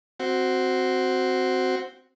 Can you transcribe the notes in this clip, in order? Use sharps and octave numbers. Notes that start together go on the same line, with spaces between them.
C4 F#4